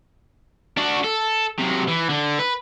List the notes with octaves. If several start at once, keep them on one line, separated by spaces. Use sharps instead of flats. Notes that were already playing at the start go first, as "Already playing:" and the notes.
D4 F#4
A4
C3 F#3
E3
D3
B4